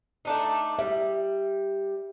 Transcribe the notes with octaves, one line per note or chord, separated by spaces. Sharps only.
A3 D4 D#4
G3 E5